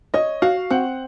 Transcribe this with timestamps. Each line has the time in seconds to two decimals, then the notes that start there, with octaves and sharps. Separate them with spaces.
0.14 C#5 D#5
0.42 F#4 F5
0.71 C4 F#5